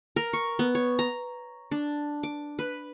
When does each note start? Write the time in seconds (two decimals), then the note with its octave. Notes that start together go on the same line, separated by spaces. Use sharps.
0.16 A#4
0.33 C#6
0.59 B3
0.75 C#5
0.99 A#5
1.71 D4
2.23 D6
2.59 B4